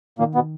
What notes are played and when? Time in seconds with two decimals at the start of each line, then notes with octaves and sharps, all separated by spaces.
0.19 A#2 D#3 A#3
0.35 B2 B3